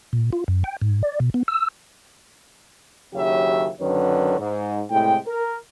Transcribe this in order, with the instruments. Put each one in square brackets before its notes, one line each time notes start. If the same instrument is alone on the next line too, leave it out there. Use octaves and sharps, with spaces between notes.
[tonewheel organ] A#2
F4
F#2
G5
G#2
D5
B2
B3
E6
[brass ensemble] F#1 D#2 C#3 F#3 G4 E5
F#2 D3 D#3 B4 C#5
G#2
A2 C3 G#3 G5
A#4